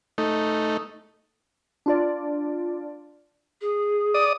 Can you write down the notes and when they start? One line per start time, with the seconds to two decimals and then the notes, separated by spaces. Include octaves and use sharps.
0.18 A3 D#4
1.86 D4 F4 D5
3.61 G#4
4.14 D5 D#6